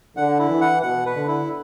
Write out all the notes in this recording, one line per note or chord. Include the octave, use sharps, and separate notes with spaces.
D3 F#5
E4
E3
F#5
B2 F#5
B4
D3
E4